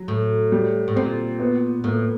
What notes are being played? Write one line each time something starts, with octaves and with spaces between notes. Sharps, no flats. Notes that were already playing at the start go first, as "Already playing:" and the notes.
Already playing: F#3
A2
G3
A2
A#2 C4
B3
A2 A#3